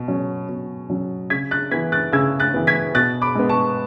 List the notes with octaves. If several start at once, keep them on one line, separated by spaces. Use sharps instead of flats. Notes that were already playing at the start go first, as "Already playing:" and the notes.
Already playing: B2
F#3 C#4
B2
F#3 C#4
C#3 G#6 B6
F#6 A6
E3 B3 G#6 B6
F#6 A6
C#3 E6 G#6
F#6 A6
E3 B3
G#6 B6
B2 F#6 A6
B5 D6
G#3 B3
A5 C#6